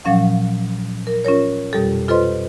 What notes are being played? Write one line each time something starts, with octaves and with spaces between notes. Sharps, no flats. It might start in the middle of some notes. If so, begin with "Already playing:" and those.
A#2 F3 F#3 C#4 F5 F#5
A#4
C#4 F4 A#4 C#5
F2 B2 G3 G4 A4
F4 A4 B4 C5 D#5 C6